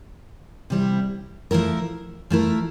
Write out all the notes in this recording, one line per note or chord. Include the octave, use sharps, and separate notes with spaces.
C3 G3 C4 E4
F3 A3 E4 A#4
F3 A3 E4 A#4